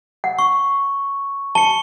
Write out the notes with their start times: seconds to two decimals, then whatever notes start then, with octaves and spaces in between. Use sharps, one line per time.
0.24 F#5
0.39 C#6
1.55 A5 C#7 G7